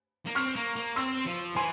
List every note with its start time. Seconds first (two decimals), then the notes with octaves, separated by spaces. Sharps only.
0.26 A#3
0.35 C4 C#6 F6
0.56 A#3
0.76 A#3
0.96 C4 C6 E6
1.26 F3
1.56 E3 G#5 C6